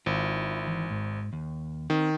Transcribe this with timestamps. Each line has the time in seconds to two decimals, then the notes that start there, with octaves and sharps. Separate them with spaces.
0.06 G#1 E4 F4
0.67 E3
0.91 G#2
1.33 D#2
1.90 D#3 C4